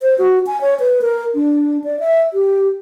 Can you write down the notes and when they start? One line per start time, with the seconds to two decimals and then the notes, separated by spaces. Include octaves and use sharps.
0.02 C5
0.18 F#4
0.47 G#5
0.61 C#5
0.80 B4
1.02 A#4
1.35 D4
1.84 D5
2.00 E5
2.33 G4